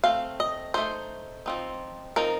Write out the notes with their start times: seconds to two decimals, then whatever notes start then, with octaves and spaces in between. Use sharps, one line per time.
0.04 A3 C4 F5
0.40 D#5
0.74 A3 C4 D#4 C5
1.46 F3 C4 D#4
2.16 F3 C4 D#4 A#4